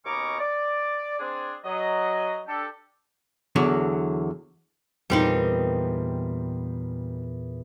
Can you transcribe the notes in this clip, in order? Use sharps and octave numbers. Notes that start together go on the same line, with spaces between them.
D#2 B2 C#4 A#5 C#6 D6
D5
C4 D4 G#4
F#3 D#5
D4 G4 A4
E2 D3 F#3
E2 A#2 G3 C4 D#4